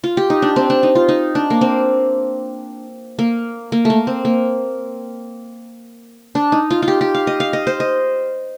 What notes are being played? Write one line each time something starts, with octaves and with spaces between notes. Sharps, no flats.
F4
G4
D#4
D4
C4
D4
D#4
F4
D#4
D4
A#3
C4
A#3
A#3
A3 A#3
C4
A#3
D4
D#4
F4
F4
G4
G4
F5
D#5
F5
D#5
C5
D#5